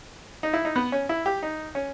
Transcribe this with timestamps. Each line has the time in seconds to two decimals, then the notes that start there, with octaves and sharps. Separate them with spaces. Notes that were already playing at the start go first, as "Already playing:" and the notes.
0.43 D#4
0.53 E4
0.65 D#4
0.76 B3
0.92 C#4
1.09 E4
1.26 G4
1.43 D#4
1.75 C#4